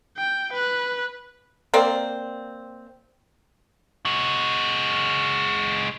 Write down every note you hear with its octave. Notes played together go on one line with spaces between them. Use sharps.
G5
B4 F#6
A#3 C4 D5
G#3 F#4